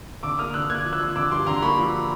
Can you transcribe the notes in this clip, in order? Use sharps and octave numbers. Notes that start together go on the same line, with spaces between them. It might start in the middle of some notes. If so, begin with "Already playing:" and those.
D3 D6 E6
A#3 D#6 F6
D3 E6 F#6
A#3 F#6 G#6
F3
E6 F#6
F3
D3 D6 E6
G2 C6 D6
D3 A#5 C6
A#3 B5 C#6
F3